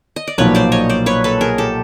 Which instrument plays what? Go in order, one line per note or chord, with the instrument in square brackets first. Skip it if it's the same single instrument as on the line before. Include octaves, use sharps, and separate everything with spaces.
[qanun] D#5
D5
[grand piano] B1 A#2 F3 [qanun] B4 C#5
[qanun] C5 D5
C#5 D#5
C5 D5
B4 C#5
A4 B4
G#4 A#4
G4 A4